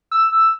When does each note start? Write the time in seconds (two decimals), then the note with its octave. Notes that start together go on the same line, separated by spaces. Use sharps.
0.11 E6